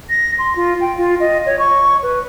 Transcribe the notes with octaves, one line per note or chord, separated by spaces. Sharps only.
A#6
C6
F4
G5
F4
D#5
C#5
C#6
B4